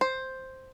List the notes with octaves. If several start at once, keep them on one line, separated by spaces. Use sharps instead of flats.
C5